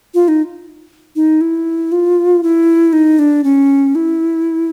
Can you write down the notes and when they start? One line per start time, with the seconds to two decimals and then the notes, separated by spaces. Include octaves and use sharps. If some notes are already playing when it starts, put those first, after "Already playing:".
0.14 F4
0.28 D#4
1.16 D#4
1.41 E4
1.92 F4
2.43 E4
2.93 D#4
3.19 D4
3.44 C#4
3.95 E4